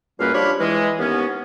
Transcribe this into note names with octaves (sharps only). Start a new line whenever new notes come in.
C#2 F#2 G3 A#3 B4 F5
F3 D4 G4 C#5 B5 F6
E3 G#3
D#2 B3 C#4